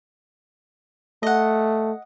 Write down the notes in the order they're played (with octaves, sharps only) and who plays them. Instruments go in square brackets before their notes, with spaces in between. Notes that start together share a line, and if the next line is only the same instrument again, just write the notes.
[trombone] A3 [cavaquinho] D#5 F#5